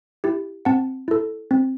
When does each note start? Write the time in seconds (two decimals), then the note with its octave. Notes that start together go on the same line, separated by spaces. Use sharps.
0.24 E4 G4
0.65 C4 F#5 A5
1.08 E4 A4
1.51 C4